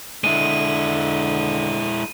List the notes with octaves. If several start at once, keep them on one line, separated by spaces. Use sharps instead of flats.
D3 G#3 E4 D#7